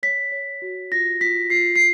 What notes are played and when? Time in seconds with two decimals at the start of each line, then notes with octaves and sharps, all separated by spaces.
0.03 C#5 B6
0.32 C#5
0.62 F#4
0.92 F4 A#6
1.21 F4 B6
1.50 F4 C7
1.76 C7